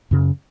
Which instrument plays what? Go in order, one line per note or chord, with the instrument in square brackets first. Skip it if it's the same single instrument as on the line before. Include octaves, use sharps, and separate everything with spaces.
[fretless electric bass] F#2 C#3